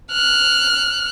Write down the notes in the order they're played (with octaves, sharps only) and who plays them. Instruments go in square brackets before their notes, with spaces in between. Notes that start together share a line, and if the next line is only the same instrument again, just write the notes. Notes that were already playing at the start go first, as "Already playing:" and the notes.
[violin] F6 F#6